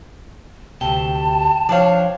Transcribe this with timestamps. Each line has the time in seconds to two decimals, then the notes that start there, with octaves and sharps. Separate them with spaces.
0.81 D2 C3 G5 A5
1.69 F3 D4 C5 C#5 F5